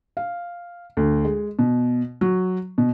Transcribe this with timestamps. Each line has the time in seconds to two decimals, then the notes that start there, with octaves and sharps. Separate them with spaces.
0.17 F5
0.97 D2
1.25 G#3
1.59 B2
2.21 F#3
2.78 B2